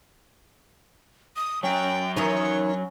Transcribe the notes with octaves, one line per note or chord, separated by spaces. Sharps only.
D#6
F#3 C#4 A#4 G5
D#3 E3 C#4 D#4 C#5